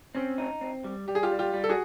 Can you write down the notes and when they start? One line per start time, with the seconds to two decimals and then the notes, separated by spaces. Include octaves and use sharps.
0.15 C4 C#4
0.38 D#4
0.61 C4
0.84 G3
1.08 G3 G4
1.15 G#4
1.23 F4 G4
1.32 G3
1.39 F4 G4
1.53 G3
1.64 A4
1.69 F#4 G#4